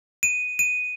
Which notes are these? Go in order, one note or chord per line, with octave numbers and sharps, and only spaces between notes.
D#7
D#7